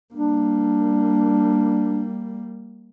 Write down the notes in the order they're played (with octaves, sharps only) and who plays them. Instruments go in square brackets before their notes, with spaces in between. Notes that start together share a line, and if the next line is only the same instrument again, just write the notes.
[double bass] G3 A#3 [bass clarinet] D4